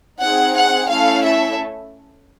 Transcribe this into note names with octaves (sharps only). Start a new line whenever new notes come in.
C4 D#4 G#4 F#5
F#5
A3 C#4 E4 A4 F5
E5